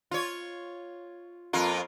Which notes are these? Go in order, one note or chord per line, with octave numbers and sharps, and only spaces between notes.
F4 C#5
F2 A#3 F4